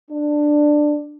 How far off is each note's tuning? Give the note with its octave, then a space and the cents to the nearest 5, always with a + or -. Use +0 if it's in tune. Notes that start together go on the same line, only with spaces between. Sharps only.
D4 +10